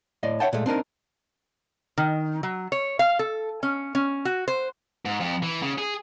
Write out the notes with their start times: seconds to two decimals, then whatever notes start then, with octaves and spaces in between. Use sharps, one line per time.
0.23 A2 D5 D#5
0.40 C#5 E5 F#5 G5 A5
0.53 A#2 G#3 A3
0.66 C4 D4 D#4 A#4
1.98 D#3
2.43 F#3
2.72 C#5
2.99 F5
3.19 A4
3.63 C#4
3.95 C#4
4.25 F#4
4.48 C5
5.05 G#2
5.20 F2
5.43 E3
5.62 C#3
5.78 G#4